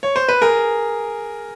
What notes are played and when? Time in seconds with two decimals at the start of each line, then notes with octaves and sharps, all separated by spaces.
0.03 C#5
0.16 C5
0.29 B4
0.42 G#4 A#4